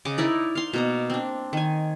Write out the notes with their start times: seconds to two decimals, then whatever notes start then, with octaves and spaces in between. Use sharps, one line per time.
0.05 C#3 D#5 D6
0.18 D#4 E4 A#4 D5
0.55 F5 C6
0.73 B2 A#3 A#5
1.10 C4 D4
1.53 D#3 G#5